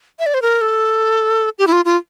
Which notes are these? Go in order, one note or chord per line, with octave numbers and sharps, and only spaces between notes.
E5
D5
C5
A#4
A4
G4
E4
F4
F4